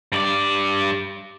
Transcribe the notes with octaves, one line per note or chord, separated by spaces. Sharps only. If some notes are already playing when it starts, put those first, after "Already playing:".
G2 D5